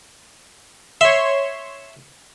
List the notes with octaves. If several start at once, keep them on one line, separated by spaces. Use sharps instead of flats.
C#5 E5 C6